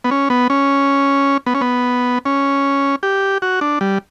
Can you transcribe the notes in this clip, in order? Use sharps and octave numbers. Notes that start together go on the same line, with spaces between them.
B3
C#4
B3
C#4
B3
C#4
B3
C#4
G4
F#4
D4
G3